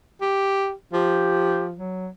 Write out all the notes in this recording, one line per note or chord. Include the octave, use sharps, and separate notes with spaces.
G4
F3 G4
F#3